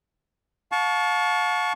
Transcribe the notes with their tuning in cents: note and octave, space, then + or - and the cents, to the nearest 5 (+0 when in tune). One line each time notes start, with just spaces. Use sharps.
F5 +40 A5 -20 C#6 +10